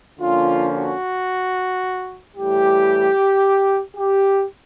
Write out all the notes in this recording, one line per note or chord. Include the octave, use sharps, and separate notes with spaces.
D3 F3 A#3 C#4 F4
F#4
A2 E3 G3 G4
G4